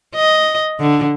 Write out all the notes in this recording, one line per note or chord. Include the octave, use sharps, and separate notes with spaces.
D#5
D3